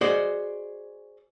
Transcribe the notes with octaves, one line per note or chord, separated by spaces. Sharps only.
F#4 G#4 C5 D5 D#5